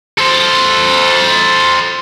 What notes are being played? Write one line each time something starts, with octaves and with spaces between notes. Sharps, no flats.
A4 C5